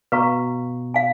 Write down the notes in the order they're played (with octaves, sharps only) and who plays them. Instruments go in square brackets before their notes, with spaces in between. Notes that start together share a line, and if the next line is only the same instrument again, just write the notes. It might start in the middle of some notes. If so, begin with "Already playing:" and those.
[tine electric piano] B2 [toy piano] F#4 B4 F5 A#5 C#6
[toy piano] F5 G#5